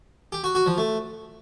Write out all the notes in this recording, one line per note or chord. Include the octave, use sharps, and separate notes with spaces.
G4
F#4
F#4
F3
A3